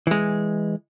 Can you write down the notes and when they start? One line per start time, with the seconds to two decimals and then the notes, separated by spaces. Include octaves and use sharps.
0.07 E3 G#3